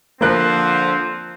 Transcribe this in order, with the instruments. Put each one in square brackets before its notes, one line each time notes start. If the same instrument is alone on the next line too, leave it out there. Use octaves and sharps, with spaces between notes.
[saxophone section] D3 F3 [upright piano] A#3 F#6 [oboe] C4